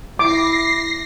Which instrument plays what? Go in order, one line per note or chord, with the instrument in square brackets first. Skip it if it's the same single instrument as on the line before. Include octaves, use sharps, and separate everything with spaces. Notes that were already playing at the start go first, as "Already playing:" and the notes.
[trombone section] E4 [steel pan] D6 [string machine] A#6 C7